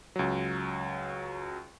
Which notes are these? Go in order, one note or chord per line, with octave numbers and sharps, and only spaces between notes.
C#2 F#3